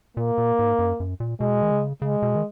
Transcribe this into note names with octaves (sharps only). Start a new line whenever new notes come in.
A#2 A#3
A#2
G#2
F#2
F#2
A#2
B2 G#3
D#3
C#3
C#3 G#3
B2
D#3